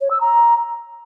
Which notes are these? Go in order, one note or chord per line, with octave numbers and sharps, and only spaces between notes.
C#5
E6
A#5